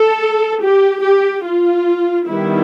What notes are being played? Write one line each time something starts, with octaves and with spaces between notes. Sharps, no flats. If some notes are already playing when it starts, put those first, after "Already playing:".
Already playing: A4
G4
G4
F4
D#3 G3 B3 E4